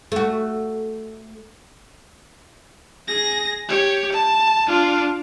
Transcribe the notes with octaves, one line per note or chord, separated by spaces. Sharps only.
A3 F#4
G#4 A#6
G4 C#5
A5
D4 F4